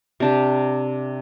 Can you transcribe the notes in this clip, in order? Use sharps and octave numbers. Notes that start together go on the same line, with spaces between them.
C3 D4 G4